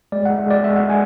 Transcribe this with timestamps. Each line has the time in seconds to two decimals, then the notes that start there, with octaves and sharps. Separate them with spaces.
0.12 G#3 D5
0.25 F#5
0.30 G#3
0.38 E5
0.47 G#3 D5
0.63 G#3 E5
0.76 F#5
0.80 G#3
0.90 G#5